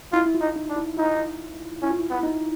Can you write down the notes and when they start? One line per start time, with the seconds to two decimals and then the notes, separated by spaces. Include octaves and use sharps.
0.12 E4 F4
0.26 E4
0.34 F4
0.41 D#4
0.56 D#4
0.69 D4
0.76 E4
0.97 D#4 F4
1.82 C#4 E4
1.90 F4
1.99 E4
2.10 B3
2.19 E4
2.23 D#4